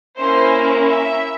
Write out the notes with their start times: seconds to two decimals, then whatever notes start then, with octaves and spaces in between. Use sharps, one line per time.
0.17 A#3 C#4 E4 C5
0.88 E5